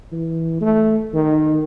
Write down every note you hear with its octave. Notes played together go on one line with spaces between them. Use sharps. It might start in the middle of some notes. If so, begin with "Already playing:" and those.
E3
A3
D#3